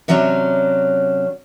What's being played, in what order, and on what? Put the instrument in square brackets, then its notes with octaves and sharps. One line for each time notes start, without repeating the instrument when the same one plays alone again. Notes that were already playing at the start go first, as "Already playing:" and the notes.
[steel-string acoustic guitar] C3 F#3 C#4 D4